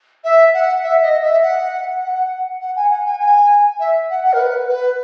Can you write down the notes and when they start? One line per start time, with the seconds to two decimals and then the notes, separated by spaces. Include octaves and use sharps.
0.24 E5
0.53 F#5
0.83 E5
1.02 D#5
1.23 E5
1.43 F#5
2.02 F#5
2.60 F#5
2.76 G#5
2.90 F#5
3.05 G#5
3.19 G#5
3.79 E5
4.09 F#5
4.24 F#5
4.33 A#4
4.39 B4
4.68 B4